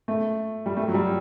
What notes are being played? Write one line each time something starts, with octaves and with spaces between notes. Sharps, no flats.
A3
G3
A3
F#3
G3